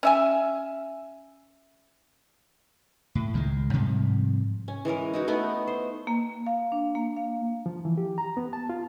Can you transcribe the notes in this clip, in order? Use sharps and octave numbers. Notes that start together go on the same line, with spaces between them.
C#4 E5 G#5
A2
C#2 D#3 F#3 G#3
G#2 C3 F3 G3
C#4
E3 G#3 C#4 A#4
D#4 E4 F#4
A3 B3 D#4
C5
A#3
F5
D4
A#3
F5
F3
E3
G4
A#5
B3
A5
F4